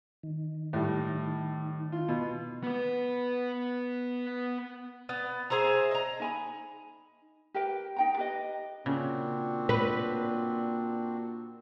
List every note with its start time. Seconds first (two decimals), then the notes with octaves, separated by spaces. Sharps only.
0.23 D#3
0.73 A2 G3
1.92 F4
2.08 B2
2.63 B3 B4
5.09 B3
5.50 G#4 C5 E5 A#5
5.91 D#5 A#5
6.20 D#4 G#5 B5
7.54 G4 A#4 B4 G5
7.96 D#4 G5 A#5
8.17 G4 B4 D#5
8.86 A#2 C#3 C4 D4 F#4
9.69 B4